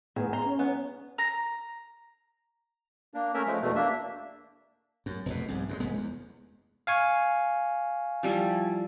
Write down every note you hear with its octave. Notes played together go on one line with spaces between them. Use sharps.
A2 D#3 B3 G#4
A#5 C6
C#4
B3
A#5
A#3 D4
A3 C#4 A#4 E5
F3 G#3 A3
E2 B2 A3
A#3 D4 E5
F#2
F1 E2 B2
C2 G#2
F#2 C3 G#3
F1 G#3 B3
E2
F5 G#5 C#6
F3 G3 E4